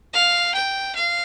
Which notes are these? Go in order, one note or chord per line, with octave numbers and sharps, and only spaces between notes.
F5
G5
F5